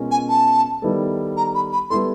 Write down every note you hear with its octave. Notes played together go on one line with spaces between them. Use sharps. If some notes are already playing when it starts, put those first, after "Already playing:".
Already playing: B2 G#3 C#4 F4 A#4
G#5
A5
D#3 G3 B3 E4 A4
A#5
B5
B5
G3 B3 E4 A4 C6